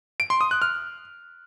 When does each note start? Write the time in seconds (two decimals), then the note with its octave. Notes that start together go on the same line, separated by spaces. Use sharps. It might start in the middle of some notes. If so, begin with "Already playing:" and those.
0.20 D7
0.30 C6
0.41 D#6
0.51 F#6
0.62 F6